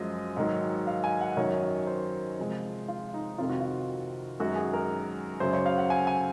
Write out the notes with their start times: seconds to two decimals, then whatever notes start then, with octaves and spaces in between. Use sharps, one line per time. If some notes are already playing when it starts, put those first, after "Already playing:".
Already playing: F#2 F3 G#3 D#5
0.36 G#2 D#3 F#3
0.87 F5
1.04 G#5
1.21 F#5
1.37 F#2 D#3 F#3 C#5
1.87 C5
2.39 C3 F3 G#3
2.88 F4
3.14 D#4
3.38 F2 C3 D#3 F4
3.50 F#4
3.60 F4
4.40 F#2 D#3 G#3 F#4
4.56 G#4
4.73 A#4
5.40 F#2 C#3 F#3 C5
5.53 C#5
5.66 F5
5.78 F#5
5.90 G#5
6.07 G#5